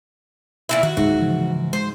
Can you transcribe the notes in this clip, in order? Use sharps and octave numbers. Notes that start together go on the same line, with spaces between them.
A#2 E3 E4
D#3 F#4
D1 G#2 G#3 F#4
C#3 E3 F3
G#3 C5